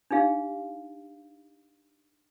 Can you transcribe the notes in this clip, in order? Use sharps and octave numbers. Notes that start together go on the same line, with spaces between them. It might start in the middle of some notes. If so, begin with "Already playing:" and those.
D4 D#4 G4 F5